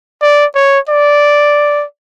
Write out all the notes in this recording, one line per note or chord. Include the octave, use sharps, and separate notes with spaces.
D5
C#5
D5